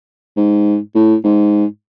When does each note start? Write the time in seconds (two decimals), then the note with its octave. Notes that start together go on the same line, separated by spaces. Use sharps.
0.36 G#2
0.94 A2
1.24 G#2